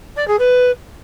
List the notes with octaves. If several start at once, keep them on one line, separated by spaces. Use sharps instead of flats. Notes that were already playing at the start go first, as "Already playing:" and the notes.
D5
G#4
B4